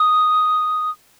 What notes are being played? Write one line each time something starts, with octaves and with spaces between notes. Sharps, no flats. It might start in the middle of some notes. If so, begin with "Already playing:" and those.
Already playing: D#6